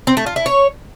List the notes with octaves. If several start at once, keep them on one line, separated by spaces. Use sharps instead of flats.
C4
A3
F4
E4
C#5